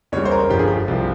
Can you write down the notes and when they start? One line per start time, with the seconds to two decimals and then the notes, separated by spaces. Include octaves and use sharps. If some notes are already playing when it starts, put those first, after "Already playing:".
0.12 E2 C#3 G3 C#5
0.25 C5
0.31 A#4
0.49 G1 G2 F3 G4
0.59 G#4
0.67 G4
0.88 C2 C3 F3